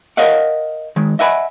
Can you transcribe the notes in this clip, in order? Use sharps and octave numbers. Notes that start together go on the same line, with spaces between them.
A#4 C#5 D#5 F5 F#5
D#3 G#3
D#5 E5 F#5 G#5 B5